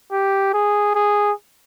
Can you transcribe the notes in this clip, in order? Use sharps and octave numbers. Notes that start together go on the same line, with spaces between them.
G4
G#4
G#4